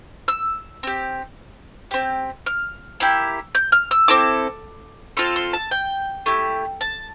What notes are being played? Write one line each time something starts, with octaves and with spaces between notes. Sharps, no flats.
E6
C4 G4
C4 G4
F6
A#3 E4 G4
G6
F6
E6
C4 E4 A4 D6
C4 F4 A4 C6
C6
A5
G5
A3 E4 G4
A5